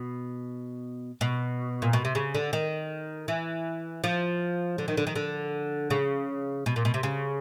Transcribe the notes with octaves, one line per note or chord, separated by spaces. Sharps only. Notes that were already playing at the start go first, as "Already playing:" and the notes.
Already playing: B2
B2
A#2
B2
C3
C#3
D3
D#3
E3
F3
D3
D#3
D3
D#3
D3
C#3
B2
A#2
B2
C3
C#3